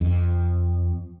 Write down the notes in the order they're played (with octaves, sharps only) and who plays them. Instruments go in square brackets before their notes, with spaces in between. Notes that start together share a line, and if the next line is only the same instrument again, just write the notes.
[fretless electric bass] F2